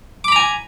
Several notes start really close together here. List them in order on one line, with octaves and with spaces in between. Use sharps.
D6 B5 A#5 G#5